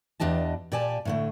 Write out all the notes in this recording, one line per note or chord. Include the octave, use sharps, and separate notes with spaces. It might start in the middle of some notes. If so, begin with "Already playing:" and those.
E2 D4 G4 D#5 A5
A#2 G4 D5 G#5 A5
A2 D3 A3